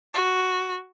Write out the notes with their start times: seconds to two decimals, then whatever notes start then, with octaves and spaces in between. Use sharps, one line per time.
0.14 F#4